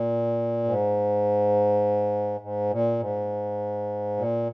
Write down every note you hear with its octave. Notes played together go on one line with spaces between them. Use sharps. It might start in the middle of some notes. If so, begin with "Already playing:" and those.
Already playing: A#2
G#2
G#2
A#2
G#2
A#2